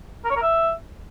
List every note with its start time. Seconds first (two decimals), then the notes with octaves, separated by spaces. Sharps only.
0.25 A#4
0.30 C#5
0.36 A#4
0.42 E5